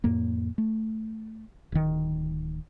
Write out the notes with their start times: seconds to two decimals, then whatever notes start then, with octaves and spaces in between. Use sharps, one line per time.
0.04 F2 A2 A#3
0.58 A3
1.72 D1 D#3